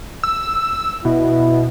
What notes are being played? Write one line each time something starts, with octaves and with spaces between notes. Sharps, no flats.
E6
B2 E4